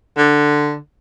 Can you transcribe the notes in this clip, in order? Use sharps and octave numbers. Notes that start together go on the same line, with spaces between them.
D3